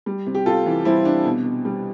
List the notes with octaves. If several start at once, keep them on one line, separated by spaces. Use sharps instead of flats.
G3
C3
G4
C3 F4 A4
E3
G3 C4 E4
C3 D4
B2
B2
G3